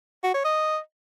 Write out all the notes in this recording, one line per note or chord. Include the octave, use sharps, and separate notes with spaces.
F#4
C#5
D#5